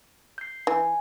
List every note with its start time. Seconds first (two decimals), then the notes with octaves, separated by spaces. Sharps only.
0.38 G6 C7
0.67 E3 G#5